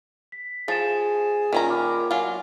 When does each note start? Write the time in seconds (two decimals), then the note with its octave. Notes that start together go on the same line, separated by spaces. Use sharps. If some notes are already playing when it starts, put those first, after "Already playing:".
0.32 B6
0.68 F3 G#4 A6 E7
1.53 A#2 D#3 C#4 A#5
1.70 B5 D6 F6
2.11 F#3 F4 G#5